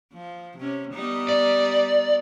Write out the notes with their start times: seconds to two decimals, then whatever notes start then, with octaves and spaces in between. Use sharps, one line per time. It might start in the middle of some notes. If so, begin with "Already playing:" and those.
0.13 F3
0.58 C3 C#4
0.94 G3 B3 D#4
1.29 D5